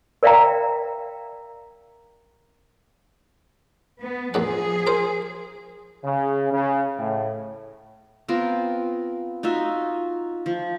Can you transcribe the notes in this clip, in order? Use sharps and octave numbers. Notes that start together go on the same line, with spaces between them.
A#4 D5 E5 F5 G5 A#5
B3
A#1 E2 F3 G#4 F#5
A#4 C5
C#3
C#3
A2
B3 C4 F4 A#4
D#4 F4 F#4 E5
F3